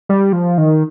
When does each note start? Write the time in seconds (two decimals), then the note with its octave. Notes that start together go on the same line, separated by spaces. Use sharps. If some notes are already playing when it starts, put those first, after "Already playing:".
0.09 G3
0.33 F3
0.58 D#3